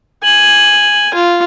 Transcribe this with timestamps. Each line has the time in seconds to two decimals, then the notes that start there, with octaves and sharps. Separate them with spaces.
0.23 G#5 F#7
1.14 F4